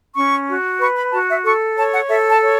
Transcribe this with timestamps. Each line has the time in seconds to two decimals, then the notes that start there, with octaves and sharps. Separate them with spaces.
0.16 C#4 C#6
0.48 F#4
0.80 B4 C#6
0.97 B5
1.13 F#4 A5
1.29 E5
1.45 A4 C#6
1.77 C#5 A5
1.93 F#5
2.09 A4 E5
2.31 A5
2.42 C#5